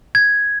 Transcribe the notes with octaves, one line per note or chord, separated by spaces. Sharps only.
G#6